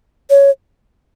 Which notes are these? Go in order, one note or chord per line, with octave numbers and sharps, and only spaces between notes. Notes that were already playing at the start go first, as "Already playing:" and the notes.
C#5